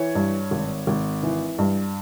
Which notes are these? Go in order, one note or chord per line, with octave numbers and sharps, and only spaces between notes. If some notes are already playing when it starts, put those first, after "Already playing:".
Already playing: E3 C#5
G2
G#1
G#1
E3
G2